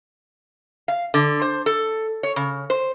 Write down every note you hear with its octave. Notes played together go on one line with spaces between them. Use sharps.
F5
D3
C5
A4
C#5
C#3
C5